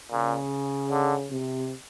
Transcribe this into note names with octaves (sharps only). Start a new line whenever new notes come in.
A#2 C#3
D3
C3